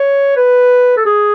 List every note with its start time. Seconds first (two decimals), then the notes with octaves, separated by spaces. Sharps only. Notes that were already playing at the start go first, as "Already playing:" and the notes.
Already playing: C#5
0.36 B4
0.97 A4
1.06 G#4